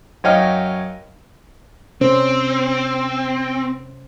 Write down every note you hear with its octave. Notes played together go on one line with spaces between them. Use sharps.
F#2 C#5 D#5 F5 G5 F6
C3 C4 C#4 C5